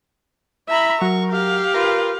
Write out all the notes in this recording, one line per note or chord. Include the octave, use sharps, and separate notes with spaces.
E4 E5 A#5 B5
F#3 A#4 C#6
G4 F5
F4 A#4 B4